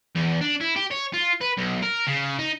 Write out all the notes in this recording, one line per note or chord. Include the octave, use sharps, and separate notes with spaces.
E2
D4
E4
G4
C#5
F4
B4
B1
A#4
C#3
D#4